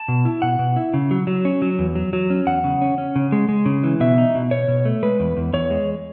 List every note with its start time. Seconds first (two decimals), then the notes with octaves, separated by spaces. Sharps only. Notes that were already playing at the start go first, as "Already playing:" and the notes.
Already playing: A5
0.08 B2
0.25 E4
0.42 B2 F#5
0.59 B2
0.76 E4
0.94 C#3
1.11 F#3
1.27 F#3
1.45 C#4
1.62 F#3
1.79 E2
1.95 F#3
2.13 F#3
2.30 C#4
2.46 E2 F#5
2.64 C#3
2.82 C#4
2.98 C#4
3.16 C#3
3.32 G#3
3.49 G#3
3.66 C#3
3.84 E3
4.00 B2 E5
4.18 D#4
4.35 B2
4.51 B2 C#5
4.68 B2
4.85 A3
5.03 G#3 B4
5.20 E2
5.37 E2
5.53 E2 C#5
5.70 G#3